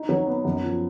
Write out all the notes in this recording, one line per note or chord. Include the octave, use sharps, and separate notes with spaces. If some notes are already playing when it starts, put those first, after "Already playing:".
Already playing: D#4
F#3
B3
F#2
F3